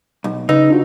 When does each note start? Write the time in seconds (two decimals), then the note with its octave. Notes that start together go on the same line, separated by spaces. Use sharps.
0.24 B1
0.49 C#3 D#4 B4 E6
0.70 D4 F4 F#4